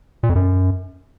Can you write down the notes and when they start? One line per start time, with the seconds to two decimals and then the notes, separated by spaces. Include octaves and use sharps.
0.23 A#2
0.29 F2
0.36 F#2